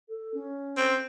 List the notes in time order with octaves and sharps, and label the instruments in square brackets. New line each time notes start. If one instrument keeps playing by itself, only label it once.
[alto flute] A4
C#4
[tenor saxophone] C4